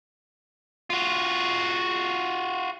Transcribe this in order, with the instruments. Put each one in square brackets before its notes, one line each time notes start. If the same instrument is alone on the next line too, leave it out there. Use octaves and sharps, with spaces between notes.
[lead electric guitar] F4 F#4